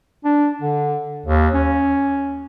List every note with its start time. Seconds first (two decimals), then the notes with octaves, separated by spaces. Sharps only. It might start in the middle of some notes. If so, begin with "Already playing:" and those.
0.24 D4
0.61 D3
1.26 D#2
1.54 C#4